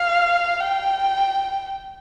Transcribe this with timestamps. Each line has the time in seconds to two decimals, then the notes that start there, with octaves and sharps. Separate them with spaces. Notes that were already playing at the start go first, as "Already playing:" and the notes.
Already playing: F5
0.60 G5